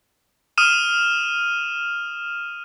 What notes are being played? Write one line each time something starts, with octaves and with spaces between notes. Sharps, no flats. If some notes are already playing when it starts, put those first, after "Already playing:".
D#6 F6 D#7 E7